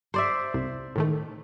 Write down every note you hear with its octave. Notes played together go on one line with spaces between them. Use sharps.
C5 D5 E5
C2
A2 D#3 A3